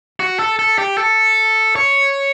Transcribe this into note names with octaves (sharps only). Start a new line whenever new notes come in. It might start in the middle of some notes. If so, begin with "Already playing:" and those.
F#4
A4
A4
G4
A4
C#5